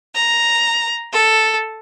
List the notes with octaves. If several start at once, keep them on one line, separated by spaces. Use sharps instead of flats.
A#5
A4